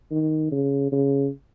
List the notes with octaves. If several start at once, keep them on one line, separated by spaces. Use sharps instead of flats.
D#3
C#3
C#3